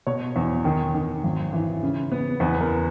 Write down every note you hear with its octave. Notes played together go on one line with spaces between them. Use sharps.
B2 C#5
E2
D#3
D#3
G#1
E3
C#3
B3
E2 B4
A#4